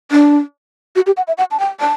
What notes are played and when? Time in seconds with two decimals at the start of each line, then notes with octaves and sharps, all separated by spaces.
0.11 D4
0.96 F#4
1.07 G4
1.17 F#5
1.28 E5
1.38 F#5
1.51 A5
1.60 G5
1.80 A5